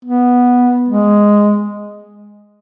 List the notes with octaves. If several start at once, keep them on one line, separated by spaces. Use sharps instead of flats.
B3
G#3